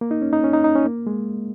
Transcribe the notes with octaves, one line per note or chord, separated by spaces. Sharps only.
A#3
D#4
C#4
D#4
C#4
D#4
D#4
C#4
A#3
G#3